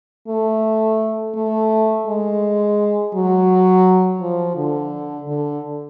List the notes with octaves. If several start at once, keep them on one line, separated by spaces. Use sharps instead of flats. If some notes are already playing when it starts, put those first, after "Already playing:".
A3
A3
G#3
F#3
F3
D3
D3